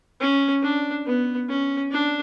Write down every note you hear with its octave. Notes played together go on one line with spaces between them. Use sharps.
C#4
D4
B3
C#4
D4